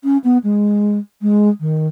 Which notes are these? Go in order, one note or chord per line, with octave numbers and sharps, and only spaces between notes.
C#4
B3
G#3
G#3
D#3